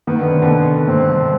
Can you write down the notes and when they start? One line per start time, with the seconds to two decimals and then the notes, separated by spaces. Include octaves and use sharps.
0.07 D#3 B3
0.19 D3
0.31 C3
0.42 B2 D3
0.87 G#2 C3 C4
1.09 G2